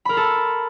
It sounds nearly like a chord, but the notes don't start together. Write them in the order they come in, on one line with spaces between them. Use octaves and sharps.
B5 A#4 C6 A4